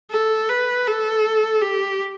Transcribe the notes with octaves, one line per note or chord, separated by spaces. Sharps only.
A4
B4
A4
G4